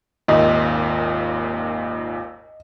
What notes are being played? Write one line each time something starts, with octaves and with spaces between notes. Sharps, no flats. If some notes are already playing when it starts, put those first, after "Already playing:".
G#1 D#2 A#2 D#5